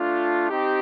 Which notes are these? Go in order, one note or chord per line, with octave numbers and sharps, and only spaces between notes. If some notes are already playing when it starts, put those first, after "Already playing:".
Already playing: A3 D4 F4
C4 D#4 G4